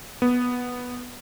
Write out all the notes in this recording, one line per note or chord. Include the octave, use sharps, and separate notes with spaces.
B3